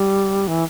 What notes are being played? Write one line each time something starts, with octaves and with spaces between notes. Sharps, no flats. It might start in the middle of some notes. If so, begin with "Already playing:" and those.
Already playing: G3
E3